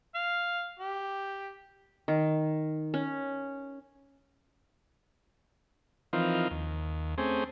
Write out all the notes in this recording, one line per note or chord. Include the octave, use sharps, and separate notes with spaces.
F5
G4
D#3
C#4
E3 F3 C4 D#4 F4 A#4
D#2
A3 C4 C#4 G#4 C5